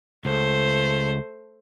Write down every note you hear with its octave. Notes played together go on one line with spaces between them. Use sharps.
C#2 A3 C5